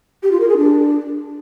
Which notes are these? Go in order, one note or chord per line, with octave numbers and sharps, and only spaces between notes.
G4
F4
A#4
G#4
D4